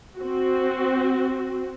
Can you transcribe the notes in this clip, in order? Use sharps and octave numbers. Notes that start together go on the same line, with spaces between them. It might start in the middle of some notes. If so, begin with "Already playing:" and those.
C4 F#4